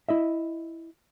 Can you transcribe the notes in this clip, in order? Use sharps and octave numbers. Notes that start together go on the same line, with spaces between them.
E4 D#5 E5